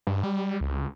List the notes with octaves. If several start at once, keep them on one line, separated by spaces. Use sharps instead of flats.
G2
G3
C#2